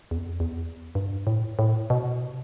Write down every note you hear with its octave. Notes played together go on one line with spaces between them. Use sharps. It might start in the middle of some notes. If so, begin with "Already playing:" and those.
E2
F2
E2
G2
A2
A2
B2
C3